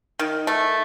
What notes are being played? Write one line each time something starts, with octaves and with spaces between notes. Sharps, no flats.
D#3
A3